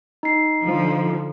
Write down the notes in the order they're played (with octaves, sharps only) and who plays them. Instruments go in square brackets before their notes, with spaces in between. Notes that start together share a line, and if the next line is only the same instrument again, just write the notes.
[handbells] D#4 C7
[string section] D3 F3